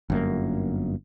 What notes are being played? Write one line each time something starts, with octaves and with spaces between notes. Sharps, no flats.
G1 F#2 A#3